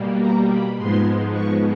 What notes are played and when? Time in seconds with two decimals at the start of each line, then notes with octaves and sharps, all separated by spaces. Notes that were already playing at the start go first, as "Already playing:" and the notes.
Already playing: B2 G3 A#3
0.20 A#5
0.49 B5
0.77 G#2 F3 G#3 B3 C6
1.34 C#6